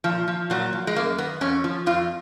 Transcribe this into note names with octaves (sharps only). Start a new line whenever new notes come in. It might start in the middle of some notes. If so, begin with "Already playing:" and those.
A#2 F3
F3
A#2 F#3
F3
G#3
F#2 A#3
D#3 B3
F2 C#4
F3
F2 F4